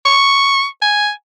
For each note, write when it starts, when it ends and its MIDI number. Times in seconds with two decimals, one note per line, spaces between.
0.06 0.66 85
0.82 1.10 80